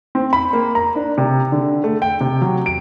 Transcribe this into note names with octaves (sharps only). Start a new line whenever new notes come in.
C4
B5
A#3
A#5
D4
C3
D3
A3
G5
C3
F#3
D7